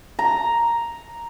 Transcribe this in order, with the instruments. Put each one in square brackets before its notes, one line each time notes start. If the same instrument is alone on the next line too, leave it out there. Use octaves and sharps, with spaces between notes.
[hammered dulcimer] A#5